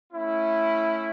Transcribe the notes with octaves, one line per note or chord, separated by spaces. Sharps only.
A3 C#4 E4